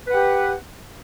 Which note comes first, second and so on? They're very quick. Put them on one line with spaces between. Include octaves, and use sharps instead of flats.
B4 F#5 G4